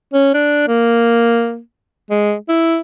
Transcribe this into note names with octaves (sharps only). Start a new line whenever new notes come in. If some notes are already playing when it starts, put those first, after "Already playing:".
C#4
D4
A#3
G#3
E4